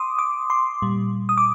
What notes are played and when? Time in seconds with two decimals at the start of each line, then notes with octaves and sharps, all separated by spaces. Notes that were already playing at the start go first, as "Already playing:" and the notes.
Already playing: C6 D6 D#6
0.19 D6
0.50 C6
0.82 A#2 G3
1.29 D#6
1.38 D6